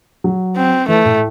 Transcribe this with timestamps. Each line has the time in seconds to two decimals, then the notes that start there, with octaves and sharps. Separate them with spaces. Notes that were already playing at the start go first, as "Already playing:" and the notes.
0.24 F#3
0.57 C4
0.88 E3 A3
1.05 A2